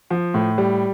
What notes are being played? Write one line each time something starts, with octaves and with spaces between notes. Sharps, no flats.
F3
A2
G3